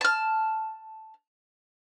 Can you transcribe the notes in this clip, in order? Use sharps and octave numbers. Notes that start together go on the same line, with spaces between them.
A5 F6